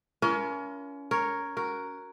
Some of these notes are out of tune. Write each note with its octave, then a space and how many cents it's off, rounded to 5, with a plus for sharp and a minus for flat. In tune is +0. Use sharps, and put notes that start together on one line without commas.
C#4 +30 F4 -45 A#4 +25
A#4 +0 C#5 +0
F#4 +0 A#4 +0